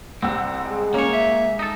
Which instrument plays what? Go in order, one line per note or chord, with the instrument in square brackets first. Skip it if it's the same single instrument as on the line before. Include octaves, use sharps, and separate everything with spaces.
[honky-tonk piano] C2 F#5 E6 [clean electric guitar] C4
[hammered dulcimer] G#3
[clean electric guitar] A#3 C#5 [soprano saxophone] C#4
[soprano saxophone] E5
[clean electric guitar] D#4 A4